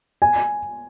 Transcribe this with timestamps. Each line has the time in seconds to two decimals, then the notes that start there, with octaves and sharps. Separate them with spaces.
0.22 G#5